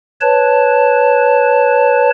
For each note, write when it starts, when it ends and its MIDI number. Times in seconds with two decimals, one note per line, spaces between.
0.21 2.10 71
0.21 2.10 73
0.21 2.10 81